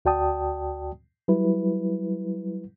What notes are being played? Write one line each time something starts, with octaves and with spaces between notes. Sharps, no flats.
D2 F#4 D5 G5 A5 D#6
F#3 G3 E4 B4